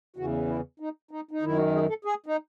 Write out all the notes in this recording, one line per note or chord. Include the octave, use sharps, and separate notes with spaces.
E2 C#3 E3 F#4
E4
D#4
D#4
D#4
F#2 D#3 E4
F#4
G#4
A4
G#4
D#4